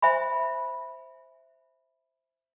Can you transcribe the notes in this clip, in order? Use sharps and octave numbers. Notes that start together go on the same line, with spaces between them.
C5 E5 G#5 B5